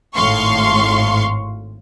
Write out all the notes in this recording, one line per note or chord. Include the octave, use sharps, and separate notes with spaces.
G#1 A2 F5 C6 C#6